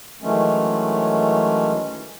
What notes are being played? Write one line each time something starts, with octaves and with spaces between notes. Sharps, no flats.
D#3 E3 F#3 G#3 A3 C#4